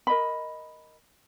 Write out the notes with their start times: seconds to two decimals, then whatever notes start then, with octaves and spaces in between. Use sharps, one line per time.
0.07 A#4 D#5 B5